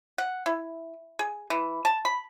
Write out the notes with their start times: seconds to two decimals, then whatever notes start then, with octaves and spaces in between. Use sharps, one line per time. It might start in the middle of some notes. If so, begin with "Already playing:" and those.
0.18 F#5
0.46 E4
1.19 G#4
1.50 E3
1.85 A5
2.05 B5